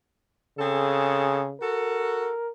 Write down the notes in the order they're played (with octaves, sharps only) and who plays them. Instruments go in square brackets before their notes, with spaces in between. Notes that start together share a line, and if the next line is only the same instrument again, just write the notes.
[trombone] C#3 [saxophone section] C4 G#4 A4
[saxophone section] F#4 A4 [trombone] A#4